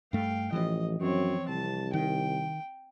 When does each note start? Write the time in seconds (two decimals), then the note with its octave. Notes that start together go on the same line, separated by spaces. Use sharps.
0.13 G2 A3 F5 G5
0.53 A1 E3 F3 D#5
1.00 F#2 C4 C#5
1.49 C2 A5
1.93 D#3 G5